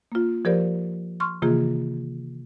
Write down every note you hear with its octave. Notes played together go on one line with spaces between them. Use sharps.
A#3 F4
F3 G4 A#4 C5 D5
C6 C#6 F6
C3 D#3 E3 A#3 F4 G#4